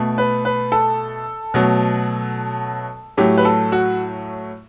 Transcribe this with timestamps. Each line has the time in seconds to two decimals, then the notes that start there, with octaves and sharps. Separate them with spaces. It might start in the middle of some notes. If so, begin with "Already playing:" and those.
Already playing: B2 A3
0.18 B4
0.45 B4
0.72 A4
1.54 B2 F#3 A3
3.17 A2 F#3 A3 G4
3.38 B4
3.45 A4
3.72 F#4